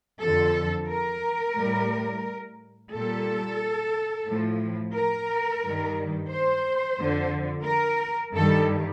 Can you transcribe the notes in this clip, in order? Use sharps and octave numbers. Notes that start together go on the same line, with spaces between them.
F2 D3 F3 A4
A#4
A2 G3
A#2 G3 A4
A2 F3
A#4
G2 D#3 G3
C5
F2 D3 F3
A#4
G2 D#3 G3 A4